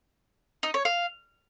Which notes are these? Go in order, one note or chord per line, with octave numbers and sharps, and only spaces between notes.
D#4
C#5
F5